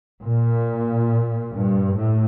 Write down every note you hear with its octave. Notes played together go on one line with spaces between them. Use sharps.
A#2
G2
A2